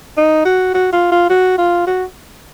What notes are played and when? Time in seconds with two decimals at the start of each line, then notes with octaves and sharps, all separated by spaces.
0.17 D#4
0.45 F#4
0.74 F#4
0.93 F4
1.12 F4
1.30 F#4
1.58 F4
1.87 F#4